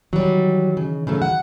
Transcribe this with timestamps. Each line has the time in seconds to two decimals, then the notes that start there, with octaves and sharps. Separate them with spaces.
0.13 D#3 E3 F#3 G3
0.77 C#3
1.07 C#3 F#3 A3
1.22 F#5